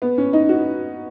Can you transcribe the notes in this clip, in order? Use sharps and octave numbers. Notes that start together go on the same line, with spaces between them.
B3
C#4
D#4
F#4